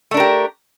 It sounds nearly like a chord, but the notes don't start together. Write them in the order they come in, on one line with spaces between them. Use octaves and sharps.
A3 D4 A#4 G4